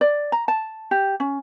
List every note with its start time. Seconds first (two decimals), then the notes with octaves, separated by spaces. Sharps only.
0.01 D5
0.32 A#5
0.48 A5
0.91 G4
1.20 C#4